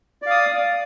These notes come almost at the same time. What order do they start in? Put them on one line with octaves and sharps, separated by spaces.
D5 F5 D#6